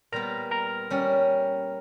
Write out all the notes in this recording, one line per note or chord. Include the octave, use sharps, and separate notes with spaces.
A#2 G3 B3 A#4 A#5
A#4 A#5
G3 C#4 G4